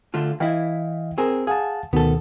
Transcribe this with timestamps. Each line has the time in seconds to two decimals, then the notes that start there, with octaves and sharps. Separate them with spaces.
0.14 D3 A3 F4
0.40 E3 E4 D#5 F5 G5
1.18 C4 G#4 A#4
1.47 G#4 F5 F#5 A5
1.93 D2 B2 D#3 B3 A4